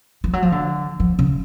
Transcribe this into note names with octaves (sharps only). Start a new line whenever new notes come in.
F3
F#3
F3
D3
F3
C#3